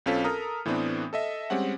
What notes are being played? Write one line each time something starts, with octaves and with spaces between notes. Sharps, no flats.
B1 C4 C#4 F4 A4 B6
A4 A#4 A#5 D#6 F6
A2 E3 A3 B3 C4 D4
A4 D#5 E5
G3 G#3 C4 C#4 F#5